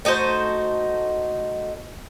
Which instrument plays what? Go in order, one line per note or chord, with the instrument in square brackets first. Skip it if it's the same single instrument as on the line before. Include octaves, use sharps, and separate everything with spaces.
[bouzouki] A3 D#4 F#4 C5